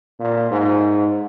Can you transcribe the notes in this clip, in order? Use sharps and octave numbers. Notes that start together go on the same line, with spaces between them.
A#2
G#2